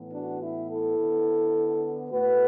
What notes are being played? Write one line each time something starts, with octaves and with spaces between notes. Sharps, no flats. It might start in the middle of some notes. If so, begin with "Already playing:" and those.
Already playing: A2 E3 B3
D4 F#4
E4
E4 A4
D3 B3
A2 A3 F#4 B4